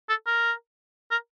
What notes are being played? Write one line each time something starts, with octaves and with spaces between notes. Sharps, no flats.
A4
A#4
A#4